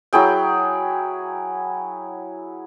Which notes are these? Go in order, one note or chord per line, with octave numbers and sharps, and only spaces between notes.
F#3 E4 G#4 G5